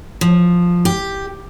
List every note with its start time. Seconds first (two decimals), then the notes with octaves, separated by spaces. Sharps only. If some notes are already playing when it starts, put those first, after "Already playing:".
0.21 F3
0.85 G4